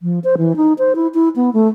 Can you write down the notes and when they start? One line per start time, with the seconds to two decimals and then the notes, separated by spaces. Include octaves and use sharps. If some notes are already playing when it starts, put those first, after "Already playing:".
0.02 F3
0.24 C5
0.38 E3
0.56 D#4
0.79 C5
0.95 E4
1.14 E4
1.36 B3
1.53 A3